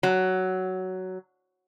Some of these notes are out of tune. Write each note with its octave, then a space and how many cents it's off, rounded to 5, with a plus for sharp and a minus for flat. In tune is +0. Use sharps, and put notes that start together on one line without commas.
F#3 +10